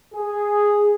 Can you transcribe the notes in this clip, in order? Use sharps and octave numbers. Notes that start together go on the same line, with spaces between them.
G#4